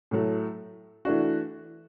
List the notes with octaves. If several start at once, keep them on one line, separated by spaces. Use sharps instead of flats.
A2 F#3 A3
E3 A3 D4 F#4